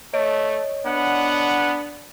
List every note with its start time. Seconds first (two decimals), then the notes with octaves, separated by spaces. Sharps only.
0.14 A3 C#5 D#5 D7
0.86 B3 D4 F#5